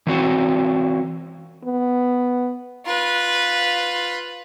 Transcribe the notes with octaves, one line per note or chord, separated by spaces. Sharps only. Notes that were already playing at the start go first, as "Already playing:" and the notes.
E3 C4 F#4
B3
F4 B4